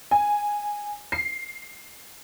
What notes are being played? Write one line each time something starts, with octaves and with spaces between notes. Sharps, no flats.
G#5
C7